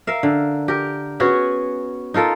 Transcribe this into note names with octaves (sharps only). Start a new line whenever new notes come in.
A#4 E5 F5
D3
G4 A#4
B3 C#4 F#4 G#4
D#4 F4 A4 A#4